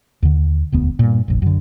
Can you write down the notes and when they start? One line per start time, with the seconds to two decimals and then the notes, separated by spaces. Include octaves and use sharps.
0.22 D#2 D3
0.72 E1 D2 B3
0.99 G2 A#2
1.28 F1 A#1
1.42 F#2 D3